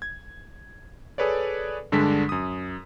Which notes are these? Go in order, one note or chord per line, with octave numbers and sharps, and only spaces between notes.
G#6
G#4 A4 B4 C#5 D5
G2 D3 G#3 D4 B6
F#2 D#6